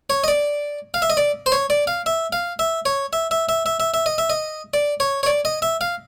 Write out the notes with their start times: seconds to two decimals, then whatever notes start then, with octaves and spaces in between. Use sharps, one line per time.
0.10 C#5
0.24 D#5
0.28 D5
0.94 F5
1.02 E5
1.10 D#5
1.17 D5
1.46 C5
1.52 C#5
1.70 D5
1.87 F5
2.06 E5
2.33 F5
2.59 E5
2.86 C#5
3.13 E5
3.31 E5
3.49 E5
3.66 E5
3.80 E5
3.94 E5
4.06 D#5
4.18 E5
4.30 D#5
4.74 D5
5.00 C#5
5.23 C#5
5.26 D5
5.45 D#5
5.62 E5
5.81 F5